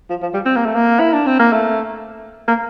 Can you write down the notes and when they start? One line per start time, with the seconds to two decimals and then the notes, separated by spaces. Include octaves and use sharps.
0.10 F3
0.22 F3
0.34 G3
0.45 C4
0.56 A#3
0.66 A3
0.75 A#3
0.99 E4
1.13 D4
1.26 C4
1.39 A#3
1.52 A3
2.48 A#3